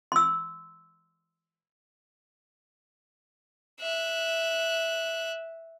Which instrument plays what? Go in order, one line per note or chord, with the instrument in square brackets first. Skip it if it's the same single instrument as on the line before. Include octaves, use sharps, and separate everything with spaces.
[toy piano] C6 E6
[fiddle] E5 F#6